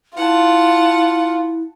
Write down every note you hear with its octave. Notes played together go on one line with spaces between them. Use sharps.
E4 F4 F#5 A5